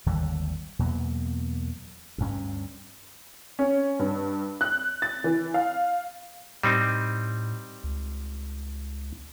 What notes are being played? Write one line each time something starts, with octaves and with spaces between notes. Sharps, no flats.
G#1 D#2 D3 G3
E2 B2 F#3 A#3
D2 G2 C#4
C#4
G2
F#6
A6
E3
F5
A2 G3 C4 D#4
C#2